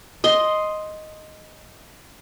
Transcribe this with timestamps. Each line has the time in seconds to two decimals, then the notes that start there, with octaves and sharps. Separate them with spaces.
0.24 D#5 C6